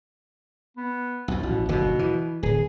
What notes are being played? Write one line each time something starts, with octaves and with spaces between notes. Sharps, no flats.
B3
B1 F2
A1 B2
F#1 D#2 B2 D3
E3
D1 G#4